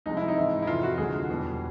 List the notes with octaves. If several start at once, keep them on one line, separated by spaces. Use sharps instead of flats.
C2 C3 F3 G#3 D#4
E4
D#4
G#2 E3 G#3
E4
F2 C3 E3 F4
F#4
D2 D3 F#3 G#4
E2 B2 G3